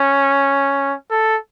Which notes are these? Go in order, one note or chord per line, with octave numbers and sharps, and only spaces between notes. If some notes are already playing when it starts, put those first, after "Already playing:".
Already playing: C#4
A4